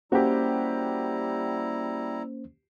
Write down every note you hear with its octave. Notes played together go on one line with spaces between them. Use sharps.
G3 A#3 C#4 E4 F#4 G4 C5 A#5